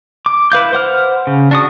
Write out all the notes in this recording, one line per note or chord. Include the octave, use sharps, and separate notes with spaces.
D6
E4 B4 F5 G6
C5 F#5 F6
C#3
D4 F#4 D#6